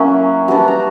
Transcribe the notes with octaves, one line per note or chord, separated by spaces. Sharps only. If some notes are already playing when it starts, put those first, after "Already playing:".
Already playing: F#3 A#3 C#4 E4
G3 B3 D4 F#4 F#5
A#5